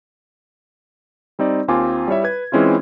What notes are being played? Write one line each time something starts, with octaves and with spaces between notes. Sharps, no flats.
G3 C4 D#4 D5
D#2 C4 F4 G#5 D6
G3 E4 C#5 E5
B4 G#6
E3 G#3 C4 C#4 E4 F4